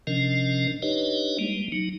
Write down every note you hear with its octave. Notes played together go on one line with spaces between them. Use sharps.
C3 F3 C#4 D4 A#4 D#5
D4 D#4 G4 B4 C#5 D#5
G3 G#3 A#3
F#3 D#4